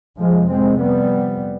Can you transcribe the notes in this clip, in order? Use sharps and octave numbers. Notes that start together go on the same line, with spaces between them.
F2 C3 F3 G#3
G#3 C4
G3 B3